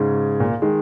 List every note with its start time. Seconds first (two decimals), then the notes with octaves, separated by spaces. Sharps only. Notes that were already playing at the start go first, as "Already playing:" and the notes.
Already playing: G#2 C#3
0.40 A#2
0.62 D#3 G#3